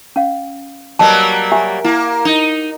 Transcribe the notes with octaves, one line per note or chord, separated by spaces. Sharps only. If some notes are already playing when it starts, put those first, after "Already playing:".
C#4 F5
F#3 G3 A#3 B4 D#5 A5
G4 E5 G#5
A#3 E4
D#4